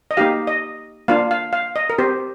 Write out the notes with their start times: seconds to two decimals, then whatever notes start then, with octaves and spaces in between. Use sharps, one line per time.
0.11 D#5
0.17 A#3 D#4 G4 F5
0.47 D#5
1.08 A#3 D4 F4 F5
1.31 F5
1.53 F5
1.76 D#5
1.90 A#4
1.98 C4 G4 C5